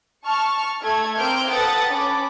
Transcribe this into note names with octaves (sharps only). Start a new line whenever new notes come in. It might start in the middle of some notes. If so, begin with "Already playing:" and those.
A5 C#6 F6
A3 A4 G#6
A#3 C4 E5 F6 G6 D7
A4 B4 F#5 G5 D#6 A6
C#4 A5 B5 D6